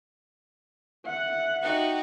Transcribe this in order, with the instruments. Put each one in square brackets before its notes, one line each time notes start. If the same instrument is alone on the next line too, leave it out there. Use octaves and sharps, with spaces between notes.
[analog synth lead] E5 [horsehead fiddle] F#5
[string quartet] D#4 F#4 G4